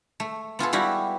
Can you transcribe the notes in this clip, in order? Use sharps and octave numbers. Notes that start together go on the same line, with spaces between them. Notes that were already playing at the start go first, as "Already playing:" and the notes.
A3
B3 F4 G#4 A4
G3 E4 F#4 G4 F5